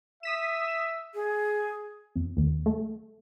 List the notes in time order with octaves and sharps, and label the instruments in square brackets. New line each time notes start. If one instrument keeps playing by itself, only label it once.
[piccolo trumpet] E5 [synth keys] D#6 B6 E7
[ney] G#4
[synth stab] F2
D#2
A3